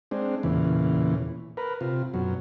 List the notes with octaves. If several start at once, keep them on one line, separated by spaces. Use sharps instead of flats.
G#3 C4 D4
E2 A#2 C#3 E3
A#4 B4
C3 F4
F#2 B2 F#3